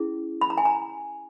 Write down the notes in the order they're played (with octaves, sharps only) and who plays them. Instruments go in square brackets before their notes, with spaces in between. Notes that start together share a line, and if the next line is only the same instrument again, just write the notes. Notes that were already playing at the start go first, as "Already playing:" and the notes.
Already playing: [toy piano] C#4 E4 G#4
B5
A#5
G#5
A#5